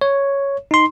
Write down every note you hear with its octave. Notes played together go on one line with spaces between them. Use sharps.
C#5
D#4 C6